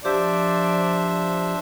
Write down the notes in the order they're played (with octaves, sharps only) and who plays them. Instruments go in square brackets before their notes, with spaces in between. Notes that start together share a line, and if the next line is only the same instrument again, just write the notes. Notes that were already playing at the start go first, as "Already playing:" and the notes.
[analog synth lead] F3 [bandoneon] D4 C5 E5 [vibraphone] G4 [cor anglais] D5